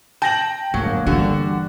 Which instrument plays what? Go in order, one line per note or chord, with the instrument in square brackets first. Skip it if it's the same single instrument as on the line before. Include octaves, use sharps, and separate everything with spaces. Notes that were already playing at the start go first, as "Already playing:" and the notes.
[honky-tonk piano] G5 A#6 F#7 [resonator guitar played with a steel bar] A5
[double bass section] G1 G#3 A#3 [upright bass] A2 [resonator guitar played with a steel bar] F#3
[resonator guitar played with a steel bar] D3 [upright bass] E3 [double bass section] G3 [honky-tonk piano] F#4